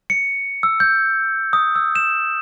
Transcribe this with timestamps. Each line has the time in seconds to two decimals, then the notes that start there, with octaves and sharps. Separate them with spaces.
0.10 C#7
0.63 E6
0.80 G6
1.53 D#6
1.76 E6
1.96 E7